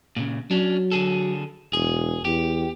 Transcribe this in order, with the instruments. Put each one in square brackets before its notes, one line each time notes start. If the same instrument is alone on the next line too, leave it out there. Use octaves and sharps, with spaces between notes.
[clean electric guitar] A#2 C#3
[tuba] F#3 [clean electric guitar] C#4 D4
[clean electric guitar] D3 G#4 A4
[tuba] E1 [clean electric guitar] G#4
[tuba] E2 [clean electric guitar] G4